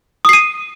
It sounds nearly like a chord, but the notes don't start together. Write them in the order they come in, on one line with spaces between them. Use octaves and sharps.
D#6 C7 D#7